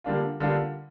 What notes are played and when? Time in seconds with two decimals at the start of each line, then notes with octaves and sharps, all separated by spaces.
0.04 D3 G3 A#3 D4 F4
0.40 D3 G3 A#3 D4 F4